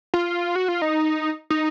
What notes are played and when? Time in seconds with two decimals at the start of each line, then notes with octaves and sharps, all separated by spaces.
0.14 F4
0.55 F#4
0.68 F4
0.82 D#4
1.50 D#4